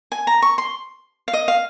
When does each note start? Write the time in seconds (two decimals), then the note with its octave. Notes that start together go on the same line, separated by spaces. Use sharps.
0.12 G#5
0.27 A#5
0.42 C#6
0.58 C6
1.28 F5
1.33 D#5
1.48 F5